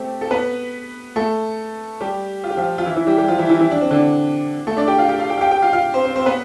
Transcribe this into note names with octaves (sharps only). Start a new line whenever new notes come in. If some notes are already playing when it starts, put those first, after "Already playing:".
Already playing: A3 C4 G4 A4
A4
B3 B4
A3 A4
G3 G4
F4
G4
F3 F4
F4
E3 E4
E3 E4
G3 G4
G3 G4
F3 F4
E3 E4
E3 E4
E3 E4
D4
C4
D3 D4
A3 A4
D4 D5
G4 G5
F4 F5
G4 G5
F4 F5
G4 G5
F5
G4 G5
G4 G5
F4 F5
F4 F5
C4 C5
C4 C5
C4 C5
B3 B4